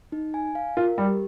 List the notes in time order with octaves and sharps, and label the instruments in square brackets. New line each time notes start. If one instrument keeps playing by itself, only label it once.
[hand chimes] D#4
G#5
F5
[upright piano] F4 [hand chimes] A#4
[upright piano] G3 [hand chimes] G4